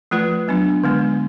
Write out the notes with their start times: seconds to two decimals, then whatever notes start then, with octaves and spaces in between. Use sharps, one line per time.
0.11 F3 A3 F4 B4
0.48 F#3 B3 D4
0.83 D3 G#3 B3